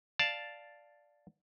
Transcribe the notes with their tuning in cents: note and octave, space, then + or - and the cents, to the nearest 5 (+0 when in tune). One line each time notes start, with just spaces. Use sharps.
D5 +0 F5 +0 A5 +0